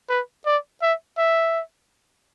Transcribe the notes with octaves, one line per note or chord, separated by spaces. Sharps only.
B4
D5
E5
E5